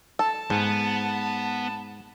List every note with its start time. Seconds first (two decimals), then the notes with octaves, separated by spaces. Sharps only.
0.19 A4 A5
0.50 G#2 B3